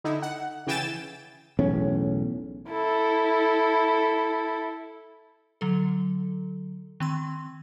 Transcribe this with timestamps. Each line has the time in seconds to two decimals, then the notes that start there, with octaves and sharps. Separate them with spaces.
0.04 D3 D#4 E4
0.22 F#5
0.67 C#3 E3 G5 G#5 A6 E7
1.59 B1 E2 A2 C#4
2.69 E4 A4
5.61 D3 F#3 A4
7.00 D#3 C4 C6